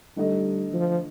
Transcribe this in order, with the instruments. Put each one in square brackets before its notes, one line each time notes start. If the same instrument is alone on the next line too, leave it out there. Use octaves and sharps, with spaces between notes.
[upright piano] D3 A3 D#4 A4 D#5 [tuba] G3
[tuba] F3